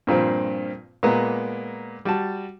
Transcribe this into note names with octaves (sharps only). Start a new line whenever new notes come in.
G2 A#2 F3 C4
A#2 G#3 A#3 B3
G3 F#4 A5